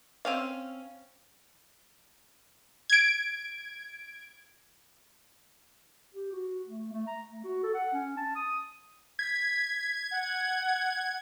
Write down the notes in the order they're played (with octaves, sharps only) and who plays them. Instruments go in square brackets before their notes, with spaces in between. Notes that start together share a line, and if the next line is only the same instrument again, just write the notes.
[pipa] C4 C#4 F5
[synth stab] G#6 D7
[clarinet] G4
F#4
A3
A3
A#5
A3
F#4
A4
F#5
C#4
A5
D#6
[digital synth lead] G#6 [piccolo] B6
[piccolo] F#5